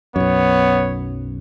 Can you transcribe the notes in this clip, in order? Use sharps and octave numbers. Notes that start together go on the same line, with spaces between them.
B1 F#2 B3 C#5